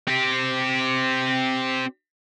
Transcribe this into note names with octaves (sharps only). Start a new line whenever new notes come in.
C4 G4